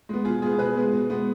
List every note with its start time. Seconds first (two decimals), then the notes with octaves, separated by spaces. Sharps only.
0.09 G#3 B3
0.25 B2 F4 G#4
0.42 G#3 B3 F4 G#4
0.59 B2 G#4 B4
0.76 G#3 B3
0.93 B2
1.10 G#3 B3